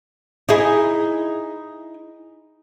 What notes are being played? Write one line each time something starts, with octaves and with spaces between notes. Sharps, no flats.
D#4 E4 G#4